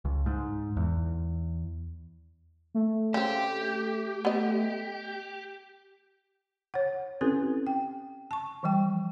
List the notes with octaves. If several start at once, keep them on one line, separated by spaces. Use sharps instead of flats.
C#2
G#2
E2
A3
C#3 C4 G4
B3 D#5
C#5 F#5
C4 C#4 E4 G4 A4 B4
G5
A5 C#6
E3 F3 G3 G5